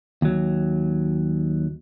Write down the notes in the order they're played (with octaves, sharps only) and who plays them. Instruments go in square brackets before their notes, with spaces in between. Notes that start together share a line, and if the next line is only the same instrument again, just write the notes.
[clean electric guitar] D#2 F#3